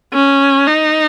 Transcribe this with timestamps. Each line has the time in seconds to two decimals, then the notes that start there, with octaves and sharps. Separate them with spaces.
0.14 C#4
0.67 D#4